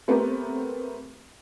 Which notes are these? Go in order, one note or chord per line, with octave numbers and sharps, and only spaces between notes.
A3 B3 C4 G4 A#4